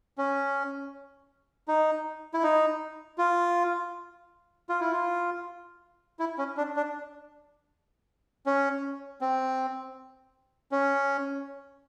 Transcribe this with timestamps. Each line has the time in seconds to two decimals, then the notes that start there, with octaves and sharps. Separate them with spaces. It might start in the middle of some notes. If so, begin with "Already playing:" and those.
0.18 C#4
1.68 D#4
2.34 E4
2.43 D#4
3.18 F4
4.69 F4
4.81 E4
4.92 F4
6.19 E4
6.38 C#4
6.57 D4
6.76 D4
8.46 C#4
9.21 C4
10.72 C#4